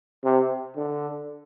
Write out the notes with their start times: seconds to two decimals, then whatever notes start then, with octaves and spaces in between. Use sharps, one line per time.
0.24 C3
0.76 D3